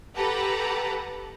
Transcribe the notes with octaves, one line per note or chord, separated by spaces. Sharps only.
G4 A4 B4 F#5 A#5